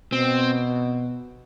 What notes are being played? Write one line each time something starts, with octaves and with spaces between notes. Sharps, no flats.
B2 C4